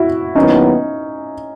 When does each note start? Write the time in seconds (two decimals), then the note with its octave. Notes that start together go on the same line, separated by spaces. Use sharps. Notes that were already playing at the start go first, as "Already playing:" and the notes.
Already playing: E4 F#4
0.35 D#2 D#3 F#3 B3 C#4 D#4 E4